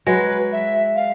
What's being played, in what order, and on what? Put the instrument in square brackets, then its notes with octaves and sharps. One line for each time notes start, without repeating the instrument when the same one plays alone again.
[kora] F#3 G#3 [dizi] B4
[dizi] E5
F5